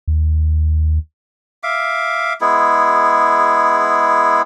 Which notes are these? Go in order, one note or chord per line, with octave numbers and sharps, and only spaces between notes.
D#2
E5 F5 D6
G#3 B3 E4 G#4